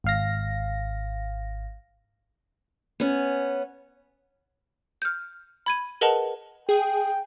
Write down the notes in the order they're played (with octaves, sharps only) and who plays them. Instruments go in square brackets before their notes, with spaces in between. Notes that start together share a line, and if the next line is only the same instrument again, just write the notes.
[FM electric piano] G#1 F5 A#6
[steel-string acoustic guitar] B3 C#4
[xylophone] F6 G6
B5 G#6 D#7
G#4 A#4 B4 D#5 F#5 A5
[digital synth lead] G#4 [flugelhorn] G5